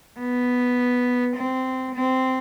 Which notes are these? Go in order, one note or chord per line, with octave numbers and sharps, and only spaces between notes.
B3
C4
C4